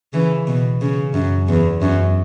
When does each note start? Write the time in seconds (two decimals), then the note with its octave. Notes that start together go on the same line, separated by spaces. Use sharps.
0.13 C#3 E3
0.47 B2
0.81 C#3
1.14 F#2
1.48 E2
1.82 F#2